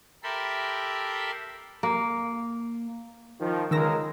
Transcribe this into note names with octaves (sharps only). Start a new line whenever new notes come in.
G4 A4 A#4 E5 B5 C6
A#3
D#3 F3
C#2 D#3 G#3 A#4 E6 A#6